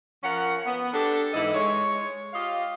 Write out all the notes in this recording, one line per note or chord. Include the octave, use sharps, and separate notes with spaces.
F3 C#4 A#4 F#5
B3
D4 G4 A4
G#2 E3 E4 A4 D#5
G#3 C#5
F4 G4 D#5 F5